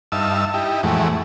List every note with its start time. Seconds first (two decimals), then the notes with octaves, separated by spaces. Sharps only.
0.12 G2 D#4 E5 F5 A5 E6
0.54 D#4 E4 G4
0.83 F2 A2 E3 G#3 A3 F#4